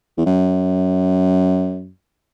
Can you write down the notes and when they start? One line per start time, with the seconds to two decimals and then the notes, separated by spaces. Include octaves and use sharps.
0.18 E2
0.26 F#2